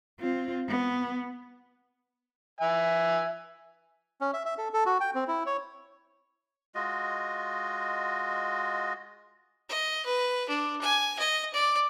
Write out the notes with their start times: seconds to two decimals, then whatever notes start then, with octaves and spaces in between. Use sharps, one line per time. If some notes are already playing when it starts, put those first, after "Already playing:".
0.20 C4 F4
0.69 B3
2.61 E5 G#5
4.21 C#4
4.34 E5
4.45 E5
4.58 A4
4.73 A4
4.86 F#4
5.00 G5
5.15 C4
5.28 E4
5.46 C#5
6.75 G#3 F4 F#4 D#5
9.69 D#5
10.05 B4
10.49 D4
10.81 G#5
11.19 D#5
11.54 D5